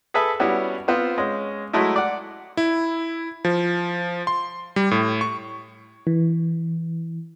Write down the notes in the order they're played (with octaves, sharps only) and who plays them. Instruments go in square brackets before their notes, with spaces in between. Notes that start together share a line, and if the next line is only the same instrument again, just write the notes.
[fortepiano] G#4 A4 B4 E5
G3 B3 C#4 E4 F#4
B3 C4 F4 C5
G#3 C#4
F#3 G#3 A3 E4
D5 F#5
[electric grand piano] E4
F3
C6
G3
A2
C#6
[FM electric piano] E3